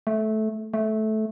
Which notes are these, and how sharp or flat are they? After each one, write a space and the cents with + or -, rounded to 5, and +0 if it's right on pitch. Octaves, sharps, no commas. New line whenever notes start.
A3 -15
A3 -15